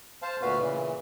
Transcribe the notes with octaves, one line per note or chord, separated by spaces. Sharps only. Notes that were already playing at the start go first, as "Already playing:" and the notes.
C5 F5 A5
D2 A#2 B3 F#4 B4 F5
A#2 C#3 E3